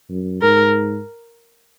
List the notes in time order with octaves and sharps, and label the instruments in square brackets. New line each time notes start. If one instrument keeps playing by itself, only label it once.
[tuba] F#2
[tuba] G#2 [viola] A#4